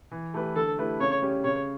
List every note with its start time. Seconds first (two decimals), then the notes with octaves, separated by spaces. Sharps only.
0.11 E3
0.34 A3 E4 G4 B4
0.56 D3 A4
0.78 A3 E4 G4 B4
1.00 C#3 C#5
1.22 G3 C#4 G4
1.44 C#3 C#5